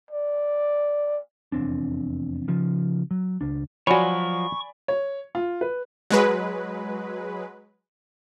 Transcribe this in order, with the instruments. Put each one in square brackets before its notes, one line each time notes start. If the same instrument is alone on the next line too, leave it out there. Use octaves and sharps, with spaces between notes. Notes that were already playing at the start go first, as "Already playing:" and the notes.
[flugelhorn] D5
[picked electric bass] F1 E2 C4 D4
C#3 F3
F#3
C#2 D4
[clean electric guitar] F3 F#3 [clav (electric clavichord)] F#4 C#5 [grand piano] D5 G#5 B5 [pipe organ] C#6
[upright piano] C#5
F4
B4
[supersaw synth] F#3 G#3 B4